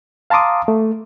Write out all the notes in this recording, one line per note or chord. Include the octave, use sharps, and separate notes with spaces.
F5 A5 A#5 C6 D6 D#6
A3